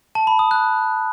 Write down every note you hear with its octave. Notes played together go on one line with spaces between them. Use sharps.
A5
B5
D#6
F#6